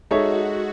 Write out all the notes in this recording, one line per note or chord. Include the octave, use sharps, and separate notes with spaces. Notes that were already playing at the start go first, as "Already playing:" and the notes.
G#3 D#4 F#4 A4 C#5 E5